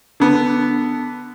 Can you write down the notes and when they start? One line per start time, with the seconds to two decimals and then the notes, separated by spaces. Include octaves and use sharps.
0.20 D3 B3